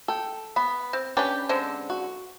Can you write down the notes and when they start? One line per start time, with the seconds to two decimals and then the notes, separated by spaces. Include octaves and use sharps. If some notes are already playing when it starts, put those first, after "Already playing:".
0.08 A4 G5
0.56 B3 B5
0.93 C4
1.17 C#4 D4 G4 B4 G5
1.49 D3 G#3 C4
1.90 F#4